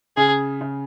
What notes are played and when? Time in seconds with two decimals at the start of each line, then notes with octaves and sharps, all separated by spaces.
0.17 C#3 G#4
0.61 C#3